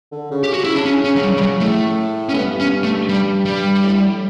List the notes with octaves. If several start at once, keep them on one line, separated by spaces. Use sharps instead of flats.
D3
C#3
G4
F#4
C#3 E4
D4
C#4
C#4
F#3
G3
G3
F#3
A2 A3
C#4
G2 B3
C#4
A3
G3
G3
A2